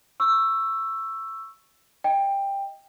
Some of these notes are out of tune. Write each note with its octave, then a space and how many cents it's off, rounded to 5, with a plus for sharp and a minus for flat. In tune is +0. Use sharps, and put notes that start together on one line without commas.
C#6 +0 E6 +10
D#5 +0 G5 +15